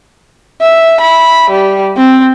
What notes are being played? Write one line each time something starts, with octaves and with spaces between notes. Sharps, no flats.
E5
B5
G3
C4